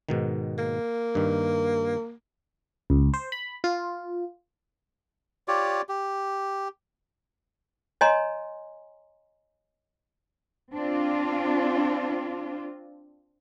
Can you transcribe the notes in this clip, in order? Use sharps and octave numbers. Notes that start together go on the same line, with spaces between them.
G#2 B2 D#3
A#3
G2 D#3
C#2
C5
B5
F4
F4 G4 C#5 D5
G4
C#5 D#5 G#5 A#5 C6
C4 D4 F4